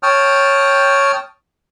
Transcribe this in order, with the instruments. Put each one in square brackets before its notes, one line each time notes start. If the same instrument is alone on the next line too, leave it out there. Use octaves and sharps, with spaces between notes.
[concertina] C#5 G5 A5 D#6 F6